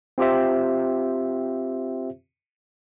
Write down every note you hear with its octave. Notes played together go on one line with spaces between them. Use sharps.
C4 F4 G4 C5 E5